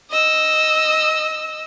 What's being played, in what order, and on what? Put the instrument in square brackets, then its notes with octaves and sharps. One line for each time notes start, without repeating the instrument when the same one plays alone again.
[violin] D#5 E6